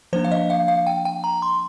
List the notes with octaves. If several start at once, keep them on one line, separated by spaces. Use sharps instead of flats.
F3 A#3 D4 C5
F5
D#5
F5
F5
G5
G5
A#5
C6